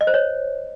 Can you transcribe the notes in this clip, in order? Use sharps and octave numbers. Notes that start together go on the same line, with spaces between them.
D#5
C5
C#5